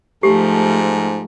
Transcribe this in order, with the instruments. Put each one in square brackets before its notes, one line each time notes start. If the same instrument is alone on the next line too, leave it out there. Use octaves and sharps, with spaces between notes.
[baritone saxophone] G#2 [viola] F3 A3 [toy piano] G4